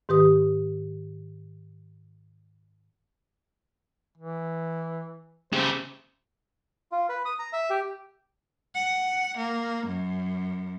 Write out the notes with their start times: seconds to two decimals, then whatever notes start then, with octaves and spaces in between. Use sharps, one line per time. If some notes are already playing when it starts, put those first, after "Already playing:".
0.09 G#2 D#3 G4 B4 D#6
4.18 E3
5.53 C#3 G4 C5
6.92 F4
7.09 B4
7.25 D#6
7.39 A#5
7.53 E5
7.70 G4
8.75 F#5
9.38 A#3
9.86 F#2